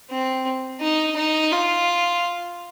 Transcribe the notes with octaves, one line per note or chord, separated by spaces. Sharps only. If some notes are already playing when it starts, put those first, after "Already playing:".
C4
D#4
D#4
F4